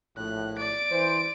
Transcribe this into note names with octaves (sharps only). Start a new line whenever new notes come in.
A#1 A2 F#6
D5 D7
E3 C5